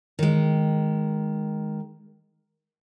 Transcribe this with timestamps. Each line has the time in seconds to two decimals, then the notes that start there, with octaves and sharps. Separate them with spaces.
0.19 D#3 G#3